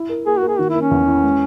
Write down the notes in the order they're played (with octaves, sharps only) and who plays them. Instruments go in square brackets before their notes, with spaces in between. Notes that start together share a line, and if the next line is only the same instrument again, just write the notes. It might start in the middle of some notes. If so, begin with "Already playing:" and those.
Already playing: [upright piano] E4
A#4
[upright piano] A#3 [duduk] G#4
[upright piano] A#3 [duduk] F#4
[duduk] G#4
[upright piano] D#3 [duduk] F#4
[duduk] E4
[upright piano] A#3
[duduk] C#4
[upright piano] E2
E4
G#3